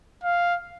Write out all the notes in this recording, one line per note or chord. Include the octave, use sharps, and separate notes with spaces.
F5